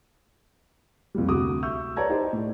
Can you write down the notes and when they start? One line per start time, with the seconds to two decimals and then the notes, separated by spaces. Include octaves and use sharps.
1.15 F2 A#2 G3
1.28 D2 C3 F#4 D6 D#6
1.63 E5 C#6 E6 G6
1.96 B4 C#5 D5 A5 A#5 G#6
2.09 D#4 G4 C5 D5
2.33 A2